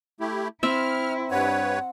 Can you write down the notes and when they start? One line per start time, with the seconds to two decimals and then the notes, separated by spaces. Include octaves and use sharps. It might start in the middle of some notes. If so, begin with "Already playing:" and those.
0.20 A3 E4 G4
0.63 C4 E4 E5 F6
1.31 G2 B4 C#5 F#5